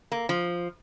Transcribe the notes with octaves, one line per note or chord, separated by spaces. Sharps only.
A#3
F3